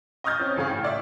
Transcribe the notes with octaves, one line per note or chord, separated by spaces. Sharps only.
D#5 C#6 D#6 F6 G6 A6
C4 C#4
G2 C#3 G#4 F5
A2
D5 E5